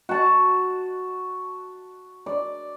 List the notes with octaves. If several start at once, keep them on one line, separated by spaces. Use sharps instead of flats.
F#4 A5
D5